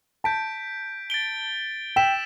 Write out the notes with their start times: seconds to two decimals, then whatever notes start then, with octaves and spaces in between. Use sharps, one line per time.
0.24 A5 G6 B6 D7
1.10 A6 D7 G7
1.96 G5 E6 B6 E7